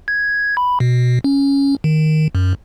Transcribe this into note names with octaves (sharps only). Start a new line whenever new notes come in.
G#6
B5
B2
C#4
D#3
F#2